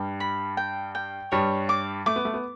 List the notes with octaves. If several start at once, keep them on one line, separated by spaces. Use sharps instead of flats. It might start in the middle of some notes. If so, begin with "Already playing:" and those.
Already playing: G2 G3
B5
G5
G5
G2 G3 C#5
D6
A3 D6
B3
A3
B3